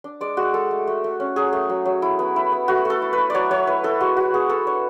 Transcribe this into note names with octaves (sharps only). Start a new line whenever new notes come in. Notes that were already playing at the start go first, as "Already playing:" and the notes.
D4
G#3 D5
G#3 F#4
G#3 A4
A3
A3
A3
C#4
F#3 G#4
A3
F#3
F#3
E4
B3
E4
B3
A3 F#4
A3 A4
E4
B4
E4
F#3 C#5 D5
F#3 C#5
E4 B4
E4 A4
G#3 F#4
E4 F#4
B3 G#4
B3 A4
D4 C#5